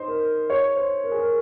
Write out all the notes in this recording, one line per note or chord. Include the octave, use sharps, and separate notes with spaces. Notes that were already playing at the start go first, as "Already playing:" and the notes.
Already playing: D#4 C5
A#4
C#5
C5
A#4
G#4
A#4